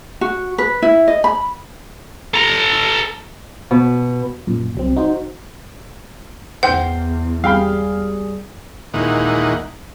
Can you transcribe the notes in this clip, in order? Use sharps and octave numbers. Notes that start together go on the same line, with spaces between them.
F#4
B4
E4
D#5
B5
A4 A#5
B2
F#2 A#2
C2 F#3 C4
D#4 F#4 C5
E2 C5 F#5 G5
G3 G#4 F5 G5 B5
D#2 A#2 E3 G#3 D#4 F#5